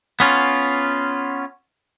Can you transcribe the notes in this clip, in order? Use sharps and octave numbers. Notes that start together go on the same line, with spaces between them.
B3 C#4 F4